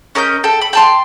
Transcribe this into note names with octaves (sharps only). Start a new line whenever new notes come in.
C#4 A#4 D#5 G6
A4 G5
B5
G5 A5 C6